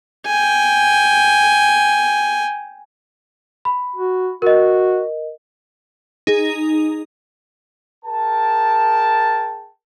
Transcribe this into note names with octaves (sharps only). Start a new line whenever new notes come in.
G5 G#5
B5
F#4
F#4 A#4 D#5
D#4 G#4
G#4 A#4 G5 A5